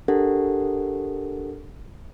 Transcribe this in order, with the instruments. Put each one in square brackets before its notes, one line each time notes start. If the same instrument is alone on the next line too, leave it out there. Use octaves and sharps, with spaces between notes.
[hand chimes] D4 G4 A4 A#4 F#5